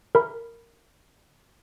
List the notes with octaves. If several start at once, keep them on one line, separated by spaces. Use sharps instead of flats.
A#4 B5